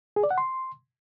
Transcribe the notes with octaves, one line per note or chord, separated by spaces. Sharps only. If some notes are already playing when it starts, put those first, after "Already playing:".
G#4
D5
F#5
C6